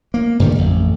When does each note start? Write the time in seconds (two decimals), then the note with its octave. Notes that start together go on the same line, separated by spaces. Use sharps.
0.14 A#3
0.40 G2 D3 D#3 G3
0.55 A1 F2